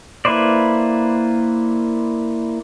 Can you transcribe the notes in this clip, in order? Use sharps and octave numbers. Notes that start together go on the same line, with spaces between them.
A#3 E4 B4 C5 D5